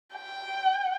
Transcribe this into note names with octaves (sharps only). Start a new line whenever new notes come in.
G5